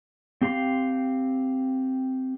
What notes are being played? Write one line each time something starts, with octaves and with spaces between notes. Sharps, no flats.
C4 G4 F5 C6